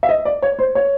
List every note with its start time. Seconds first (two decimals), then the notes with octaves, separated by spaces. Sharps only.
0.03 E5
0.09 D#5
0.25 D5
0.42 C#5
0.59 C5
0.75 C#5